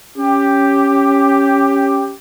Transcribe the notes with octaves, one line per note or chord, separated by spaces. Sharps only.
C#4 G4